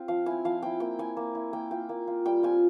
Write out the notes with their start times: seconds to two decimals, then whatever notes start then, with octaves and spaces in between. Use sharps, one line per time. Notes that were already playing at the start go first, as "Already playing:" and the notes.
Already playing: C4 F4
0.08 F3 F5
0.26 C4 E4 G#5
0.45 F3 F5
0.62 C4 E4 G5
0.80 A#3 G5
0.99 E4 G#5
1.17 A#3
1.35 E4
1.53 A#3 G5
1.71 F4 G5
1.89 A#3
2.07 F4
2.26 G3 G5
2.43 C4 F4 G#5